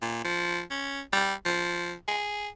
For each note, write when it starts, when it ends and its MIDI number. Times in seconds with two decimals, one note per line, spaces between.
0.02 0.23 46
0.25 0.62 53
0.71 1.01 61
1.13 1.34 55
1.45 1.94 53
2.08 2.48 68